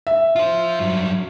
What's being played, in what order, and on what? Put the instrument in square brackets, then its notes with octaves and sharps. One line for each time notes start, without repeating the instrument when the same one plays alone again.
[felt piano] E5
[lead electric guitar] F4 C5
G2 F#3